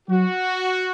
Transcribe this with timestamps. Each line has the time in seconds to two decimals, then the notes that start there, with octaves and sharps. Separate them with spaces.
0.09 F#3 F#4